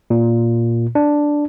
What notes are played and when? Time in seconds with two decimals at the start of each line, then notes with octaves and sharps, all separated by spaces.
0.10 A#2
0.95 D4